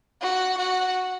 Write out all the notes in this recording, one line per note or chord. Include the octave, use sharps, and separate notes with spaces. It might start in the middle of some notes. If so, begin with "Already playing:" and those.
F#4
F#4